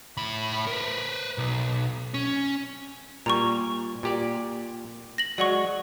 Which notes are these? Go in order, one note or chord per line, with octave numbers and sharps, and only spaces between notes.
A2 B5
A#4 B4
B1
C#4
A#2 G3 A#5 C#6
A#2 G4 D5
A#6 F#7
F#3 G#3 D5 F#5 C#6